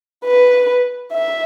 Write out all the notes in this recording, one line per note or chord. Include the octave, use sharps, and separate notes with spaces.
B4
E5